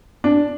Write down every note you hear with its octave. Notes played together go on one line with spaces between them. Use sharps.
D4